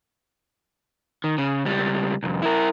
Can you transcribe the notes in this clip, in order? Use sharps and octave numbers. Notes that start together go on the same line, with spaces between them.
D#3
C#3
C#2 G3
C2 F2
E4 A#4